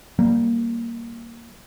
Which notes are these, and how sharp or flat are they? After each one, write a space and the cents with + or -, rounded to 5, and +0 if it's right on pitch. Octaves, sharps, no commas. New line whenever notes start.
G3 -5 A#3 +0